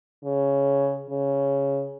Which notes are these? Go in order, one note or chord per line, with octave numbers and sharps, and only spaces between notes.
C#3
C#3